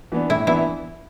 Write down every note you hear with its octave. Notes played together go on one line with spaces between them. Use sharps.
E3 B3 D4
A2 E4
E3 B3 D4 E4